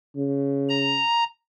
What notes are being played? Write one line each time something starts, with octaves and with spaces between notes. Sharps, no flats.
C#3
A#5